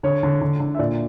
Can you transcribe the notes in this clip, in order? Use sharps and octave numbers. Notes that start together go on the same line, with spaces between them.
D3 C#5
D3
D3
D3
E5
A#2 D5